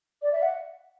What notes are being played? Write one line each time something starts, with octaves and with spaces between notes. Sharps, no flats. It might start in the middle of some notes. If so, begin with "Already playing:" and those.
D5
E5
F#5